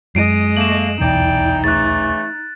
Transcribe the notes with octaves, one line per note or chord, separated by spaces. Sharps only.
F#2 G#3 D#5 C7 D7 D#7
A3 A#3 E7 F#7
D#1 B1 E2 E3 D#4 D5 G5
C#3 E3 A3 F#6 A6